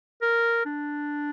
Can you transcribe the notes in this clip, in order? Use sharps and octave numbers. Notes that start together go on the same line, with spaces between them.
A#4
D4